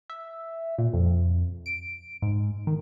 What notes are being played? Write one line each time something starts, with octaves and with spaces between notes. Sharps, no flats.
E5
A#2
F2
D7
G#2
D#3